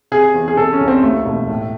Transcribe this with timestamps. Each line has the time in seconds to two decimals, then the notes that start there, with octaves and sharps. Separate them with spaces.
0.12 C3 G#4
0.34 E2
0.48 G#4
0.57 C3 A4
0.73 C#4
0.81 C2
0.88 C4
1.02 D#2 A3
1.26 E1
1.49 A2